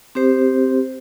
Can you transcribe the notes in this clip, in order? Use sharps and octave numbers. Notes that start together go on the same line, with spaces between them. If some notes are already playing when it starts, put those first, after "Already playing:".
C4 G4 C5